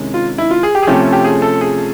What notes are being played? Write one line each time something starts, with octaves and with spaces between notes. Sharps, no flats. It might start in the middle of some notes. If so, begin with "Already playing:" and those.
Already playing: C3 D#3 G#3 C#4 E4
F4
E4
F4
G#4
G4
G#4
C3 F3 A3 C#4 G4
G4
G#4
A4
G#4